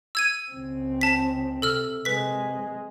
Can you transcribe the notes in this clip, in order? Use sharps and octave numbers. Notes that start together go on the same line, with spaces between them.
E6 G#6 D#7
C#2 C4
A5 B6
C3 A4 E6 F6
C3 G#3 B4 B6